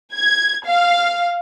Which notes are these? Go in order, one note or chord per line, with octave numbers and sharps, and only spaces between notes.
G#6
F5